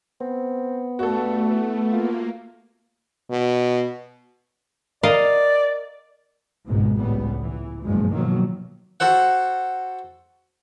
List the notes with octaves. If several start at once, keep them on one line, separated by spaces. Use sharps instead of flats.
B3 C4
G2 A3 F#4 A4
E3
A#3 F4
B2
A#4 D5 D#5 F5
G#1 C#2 G#2 B2 G#3
C#2 A2 G3 B3
E3
F#1 G2 B2 F3 G#3
B2 D#3 F3 F#3 A#3
F#4 A4 C5 F#5